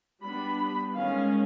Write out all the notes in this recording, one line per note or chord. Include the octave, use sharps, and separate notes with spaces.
G3 B3 D4 B5
D#3 G#3 C#4 F5